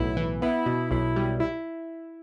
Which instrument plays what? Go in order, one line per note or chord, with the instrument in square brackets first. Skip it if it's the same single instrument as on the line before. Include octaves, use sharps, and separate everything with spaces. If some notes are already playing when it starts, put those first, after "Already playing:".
Already playing: [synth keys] B1 A2 B3 [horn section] E4
[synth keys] E3
[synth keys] B3 [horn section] E4
[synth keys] B2
[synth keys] B1 [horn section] E4
[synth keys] G3
E4